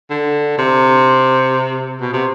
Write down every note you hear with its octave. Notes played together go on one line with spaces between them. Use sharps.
D3
C3
B2
C3